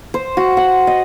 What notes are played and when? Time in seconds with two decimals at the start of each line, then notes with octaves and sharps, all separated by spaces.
0.14 C5
0.37 F#4
0.57 F#5
0.87 D#5